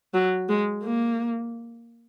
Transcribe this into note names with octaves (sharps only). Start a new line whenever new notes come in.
F#3
G#3
A#3